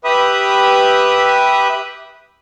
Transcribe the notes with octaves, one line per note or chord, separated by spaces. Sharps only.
G4 B4 E5 B5 D#6